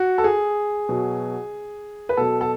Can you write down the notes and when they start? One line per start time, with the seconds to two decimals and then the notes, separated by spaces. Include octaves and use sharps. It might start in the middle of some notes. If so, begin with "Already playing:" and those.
Already playing: F#4
0.18 A4
0.24 G#4
0.89 B2 F#3
2.09 B4
2.17 B2 F#3 A4
2.41 A4